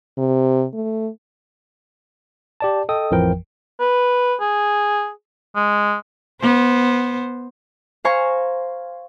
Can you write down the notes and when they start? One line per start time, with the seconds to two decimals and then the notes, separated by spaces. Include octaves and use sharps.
0.18 C3
0.73 A3
2.60 G4 D5 A5
2.89 A4 D#5 G5 D#6
3.11 A1 F2 E3 F3 A#4 G5
3.80 B4
4.40 G#4
5.56 G#3
6.41 B3 C5
8.05 C5 F5 G#5 A#5 C#6